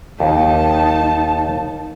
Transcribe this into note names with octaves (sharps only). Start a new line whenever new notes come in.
D#2 D#4 A5